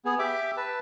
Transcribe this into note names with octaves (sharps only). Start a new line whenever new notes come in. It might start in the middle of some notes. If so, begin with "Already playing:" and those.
B3 G#4
G4 E5 D6
B4 A5